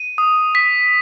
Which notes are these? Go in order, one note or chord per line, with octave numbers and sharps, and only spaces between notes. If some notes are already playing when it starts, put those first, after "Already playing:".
Already playing: D#7
D#6
B6